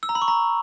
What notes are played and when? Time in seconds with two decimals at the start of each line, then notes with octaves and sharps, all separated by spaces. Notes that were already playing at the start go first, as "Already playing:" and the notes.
0.03 E6
0.09 A#5
0.15 B5
0.22 C#6
0.28 A#5